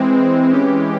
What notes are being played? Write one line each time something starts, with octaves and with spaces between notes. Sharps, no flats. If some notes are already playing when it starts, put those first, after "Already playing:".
Already playing: E3 G#3 C4
E3 G#3 C#4 G4